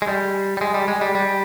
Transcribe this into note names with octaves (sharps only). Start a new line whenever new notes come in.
G#3
G3
G3
G#3
G3
G#3
G3
G3